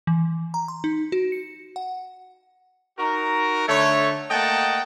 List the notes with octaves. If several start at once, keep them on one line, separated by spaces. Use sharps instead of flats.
E3
A#5
C6
D#4
F#4
C#7
F#5
D#4 F#4 A#4
D3 A3 C#5
A3 A#3 D#5 F#5 G5 A5